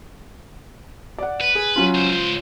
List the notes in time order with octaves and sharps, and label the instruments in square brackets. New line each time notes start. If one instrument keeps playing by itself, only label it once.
[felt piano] D5 F#5
[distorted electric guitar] B4
[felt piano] G#4
F#3 C#4 F4
[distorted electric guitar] C#2 C5
[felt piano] F4